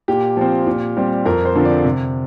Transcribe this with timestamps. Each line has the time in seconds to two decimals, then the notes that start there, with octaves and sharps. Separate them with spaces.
0.08 A#2 G4
0.37 F3 C4
0.67 A#2
0.97 G3 C4
1.25 F2 A#4
1.45 C5
1.55 D3 F3 C4
1.65 D5
1.85 C3